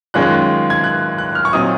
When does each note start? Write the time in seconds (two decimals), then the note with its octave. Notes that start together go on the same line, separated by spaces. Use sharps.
0.14 F#2 D#3 G#3 C#4 F4 F#6
0.70 G#6
0.84 F#6
1.18 F#6
1.35 F6
1.45 C#6
1.53 A#2 F#3 C4 D#4 D#6